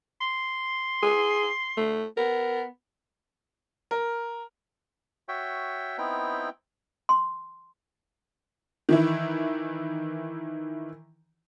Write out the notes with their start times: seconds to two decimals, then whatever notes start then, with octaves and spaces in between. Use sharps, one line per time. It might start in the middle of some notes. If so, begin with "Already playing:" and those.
0.21 C6
1.03 G#4
1.77 A3
2.17 B3 A#4
3.91 A#4
5.29 F#4 C#5 E5 G5
5.98 B3 C4 D#4 E4 G5
7.09 C6
8.89 D#3 E3 E4